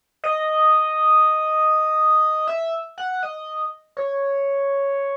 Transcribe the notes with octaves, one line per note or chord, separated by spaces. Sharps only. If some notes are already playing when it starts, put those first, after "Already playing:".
D#5
E5
F#5
D#5
C#5